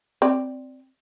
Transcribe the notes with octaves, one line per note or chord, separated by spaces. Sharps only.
C4 D5